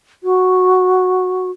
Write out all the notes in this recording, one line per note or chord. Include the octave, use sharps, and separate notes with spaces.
F#4